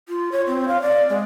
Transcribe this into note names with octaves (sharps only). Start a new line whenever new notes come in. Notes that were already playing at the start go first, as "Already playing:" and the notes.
F4
C#5
C4
F5
D5
G#3